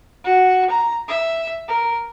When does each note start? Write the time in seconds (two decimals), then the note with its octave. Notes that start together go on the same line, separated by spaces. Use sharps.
0.24 F#4
0.70 A#5
1.08 E5
1.68 A#4